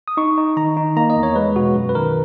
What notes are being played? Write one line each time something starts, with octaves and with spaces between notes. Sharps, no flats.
D#6
D#4 C#6
D#4
D#3 A#5
D#4
A#3 A#5
D#5
E2
C#5
G#3 B4
B2 F#4
F#2
B4
D#3 A#4